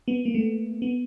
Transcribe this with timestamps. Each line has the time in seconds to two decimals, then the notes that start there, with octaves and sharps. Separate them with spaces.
0.08 B3
0.25 A#3
0.35 A3
0.82 B3